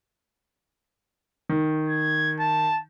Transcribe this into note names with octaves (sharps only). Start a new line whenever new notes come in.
D#3
G#6
A5